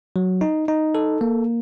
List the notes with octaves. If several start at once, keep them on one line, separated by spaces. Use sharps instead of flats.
F#3
D#4
D#4
A4
A#3